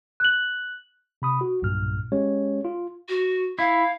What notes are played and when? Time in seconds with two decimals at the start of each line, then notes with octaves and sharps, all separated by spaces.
0.20 F#6 F#7
1.22 C3 B5 D#6
1.41 F#4
1.62 B1 G2 A#2 F6
2.12 G#3 C#4 G4 C#5
2.65 F4
3.09 F#4
3.59 E4 F5